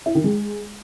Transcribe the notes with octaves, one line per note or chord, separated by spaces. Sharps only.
E4
D#3
G#3